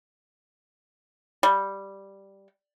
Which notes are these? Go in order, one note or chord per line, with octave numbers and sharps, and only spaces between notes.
G3